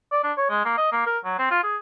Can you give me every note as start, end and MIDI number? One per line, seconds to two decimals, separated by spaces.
0.11 0.20 74
0.24 0.32 62
0.37 0.46 73
0.50 0.63 56
0.65 0.73 58
0.77 0.89 75
0.92 1.02 58
1.06 1.18 70
1.24 1.35 54
1.38 1.49 60
1.51 1.62 65
1.63 1.76 68